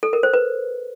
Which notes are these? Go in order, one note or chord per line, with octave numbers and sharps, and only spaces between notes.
A4
A#4
C5
B4